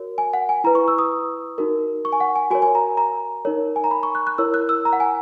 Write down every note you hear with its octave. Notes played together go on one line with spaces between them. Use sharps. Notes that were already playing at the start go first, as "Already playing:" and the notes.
Already playing: F#4 A#4 C#5
G#5
F#5
G#5
E4 B4 A#5
C#6
E6
D#6
D#4 F#4 A#4
C#6
G#5
F#5
G#5
F#4 A#4 C#5 G#5
G#5
A#5
A#5
D#4 A#4 C#5
G#5
A#5
B5
C#6
F#6
F#6
E4 A#4 C#5 E6
F#6
E6
A#5
F#5
G#5